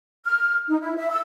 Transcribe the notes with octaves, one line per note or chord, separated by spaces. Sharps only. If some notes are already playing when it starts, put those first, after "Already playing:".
F6
D#4
E4
E5
E6